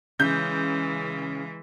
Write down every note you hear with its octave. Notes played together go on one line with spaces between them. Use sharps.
C#3 E3 G#3 G6